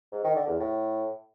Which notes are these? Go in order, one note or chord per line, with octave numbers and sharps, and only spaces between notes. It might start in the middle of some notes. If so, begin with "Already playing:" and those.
G#2
D#3
D3
E2
A2